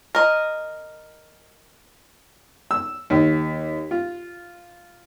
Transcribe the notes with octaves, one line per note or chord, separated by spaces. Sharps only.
A#4 D#5
E6
D#2
F4